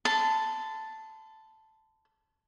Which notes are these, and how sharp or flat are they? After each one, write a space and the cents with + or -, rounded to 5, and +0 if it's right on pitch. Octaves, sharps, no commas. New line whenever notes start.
A5 +0 C6 -40